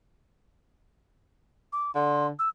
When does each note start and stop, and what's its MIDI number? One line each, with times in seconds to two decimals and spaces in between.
1.73 1.94 86
1.95 2.30 50
1.95 2.27 84
2.39 2.49 88